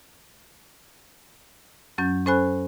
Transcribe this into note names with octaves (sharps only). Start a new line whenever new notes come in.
F#2 F#3 C#4 G6
C#4 A4 C5 G#5 B5 F#6